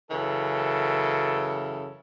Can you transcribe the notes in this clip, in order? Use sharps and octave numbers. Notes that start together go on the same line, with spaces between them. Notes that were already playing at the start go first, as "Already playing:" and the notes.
F#2 C#3 E3 A4